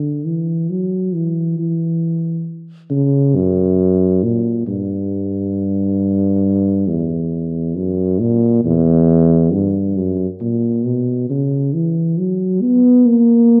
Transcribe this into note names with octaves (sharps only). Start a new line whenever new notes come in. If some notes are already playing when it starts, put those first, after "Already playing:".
Already playing: D3
E3
F#3
E3
E3
C#3
F#2
A#2
G2
E2
F#2
A#2
E2
G2
F#2
A#2
B2
C#3
E3
F#3
B3
A#3